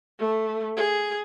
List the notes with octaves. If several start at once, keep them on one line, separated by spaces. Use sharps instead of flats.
A3
G#4